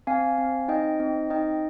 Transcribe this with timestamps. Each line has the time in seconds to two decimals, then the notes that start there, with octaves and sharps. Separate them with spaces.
0.07 C4 F5 G#5
0.38 C4
0.68 D#4 D#5 G5
1.00 C4
1.30 D#4 D#5 G5